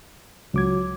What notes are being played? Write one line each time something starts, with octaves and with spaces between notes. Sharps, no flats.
C#2 F#3 D6 G#6